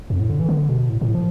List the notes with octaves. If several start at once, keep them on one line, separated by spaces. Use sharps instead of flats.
F2
A2
D3
E3
D3
B2
A2
A2
F3